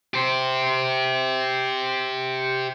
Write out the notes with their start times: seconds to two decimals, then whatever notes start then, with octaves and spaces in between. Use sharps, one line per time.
0.14 G4 C5